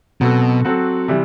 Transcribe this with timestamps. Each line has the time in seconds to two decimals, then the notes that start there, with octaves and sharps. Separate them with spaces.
0.21 B2 F#3 C4 F#4 A4
0.65 F#3 C4 F#4 A4
1.08 C3 E3 G3